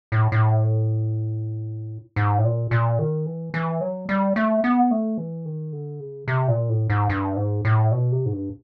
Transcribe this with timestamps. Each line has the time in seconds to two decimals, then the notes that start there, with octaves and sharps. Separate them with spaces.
0.12 A2
0.32 A2
2.16 G#2
2.38 A2
2.44 A#2
2.71 A#2
2.99 D#3
3.26 E3
3.54 E3
3.81 F#3
4.09 G3
4.36 A3
4.64 B3
4.91 A3
5.18 E3
5.45 D#3
5.73 D3
6.00 C#3
6.28 C3
6.48 A#2
6.69 A2
6.90 G#2
7.09 G2
7.36 G#2
7.65 A2
7.91 B2
8.12 C3
8.26 G#2
8.33 G2